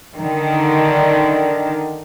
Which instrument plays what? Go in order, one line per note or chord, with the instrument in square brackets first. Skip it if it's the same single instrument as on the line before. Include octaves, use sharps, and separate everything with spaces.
[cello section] D3 D#3